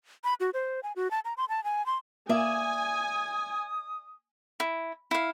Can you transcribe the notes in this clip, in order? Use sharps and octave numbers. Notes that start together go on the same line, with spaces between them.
B5
F#4
C5
G#5
F#4
A5
A#5
C6
A5
G#5
C6
A#3 D5 E5 G#5 D#6
E4
E4 F5